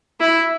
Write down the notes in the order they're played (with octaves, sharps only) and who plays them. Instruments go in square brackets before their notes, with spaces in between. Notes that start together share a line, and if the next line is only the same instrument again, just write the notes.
[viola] E4